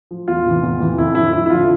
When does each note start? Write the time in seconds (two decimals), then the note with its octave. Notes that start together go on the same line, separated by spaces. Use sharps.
0.11 F3
0.28 E2 F4
0.46 C3 E3
0.63 E2
0.80 C3 E3
0.98 F2 E4
1.15 D3 F3 E4
1.33 F2 E4
1.46 E4
1.50 D3 F3 F4